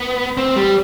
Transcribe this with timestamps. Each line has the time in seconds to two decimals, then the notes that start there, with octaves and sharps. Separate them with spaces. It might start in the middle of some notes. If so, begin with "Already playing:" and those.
Already playing: B3
0.37 C4
0.56 G3